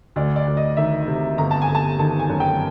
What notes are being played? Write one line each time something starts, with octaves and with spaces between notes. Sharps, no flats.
D2 D5
D5
D2
D#5
D#3 E5
C3
G1 A#5
A5
G#5
G1
A5
D#3 A5
G#5
F#2
G5